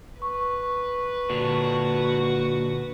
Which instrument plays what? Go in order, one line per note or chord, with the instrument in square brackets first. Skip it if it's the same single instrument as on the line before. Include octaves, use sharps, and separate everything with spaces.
[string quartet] B4 [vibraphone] C#6
[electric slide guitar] A#2 D3 D4 [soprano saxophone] F#4